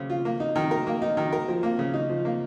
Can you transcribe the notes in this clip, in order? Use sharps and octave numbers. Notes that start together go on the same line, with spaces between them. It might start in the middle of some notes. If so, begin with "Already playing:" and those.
Already playing: C#3 C4
F4
A#3
D#4
D#3
A#4
A#3
D#4
D#3
A#4
F3
A#3
C#3
D#4
F3
A#3